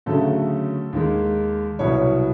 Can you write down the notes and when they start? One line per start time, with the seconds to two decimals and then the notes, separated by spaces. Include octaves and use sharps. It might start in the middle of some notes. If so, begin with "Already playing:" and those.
0.06 D2 C#3 F#3 A3 A4
0.93 D#2 D#3 G#3
1.79 C2 B2 F#3 C#5